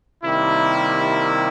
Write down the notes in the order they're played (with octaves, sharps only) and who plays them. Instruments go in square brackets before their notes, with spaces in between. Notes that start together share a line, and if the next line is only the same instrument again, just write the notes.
[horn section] C3 D#3 G3 A#3 E4